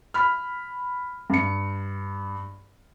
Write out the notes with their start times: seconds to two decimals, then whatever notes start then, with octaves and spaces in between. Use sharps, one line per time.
0.14 B5 F6
1.30 G2 C#7